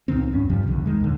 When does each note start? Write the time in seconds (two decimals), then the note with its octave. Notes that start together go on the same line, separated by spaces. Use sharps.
0.08 C#2 A#2 D#3 C4
0.31 E2 G2 C#4
0.49 G2 C3 F3 G3
0.67 B1 E2 D3
0.86 D#3 G#3
1.00 D#2 A#2 D3